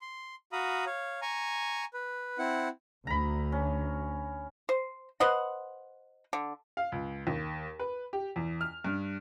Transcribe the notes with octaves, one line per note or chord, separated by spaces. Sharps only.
C6
F#4 F5 A#5 B5 D#6
C#5 F5
G#5 A#5 C#6
B4
C4 E4 F#5
D2 A#5 B5
C#4
C5
B4 C5 D#5 F#5
D3
F5
C#2
D#2
B4
G4
E2
F6
G2